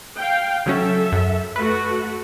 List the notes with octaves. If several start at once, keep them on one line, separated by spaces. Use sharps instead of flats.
F5 G5
C#3 F#3 C#4 A4 E5
F#2
A3 F#4 B4